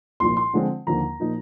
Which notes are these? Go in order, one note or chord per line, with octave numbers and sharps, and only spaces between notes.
C2 A#2 F3 C6
C6
D3 F3 G#3 C4
D#2 D3 F3 A#3 A#5
A#2 F3 A#3 D#4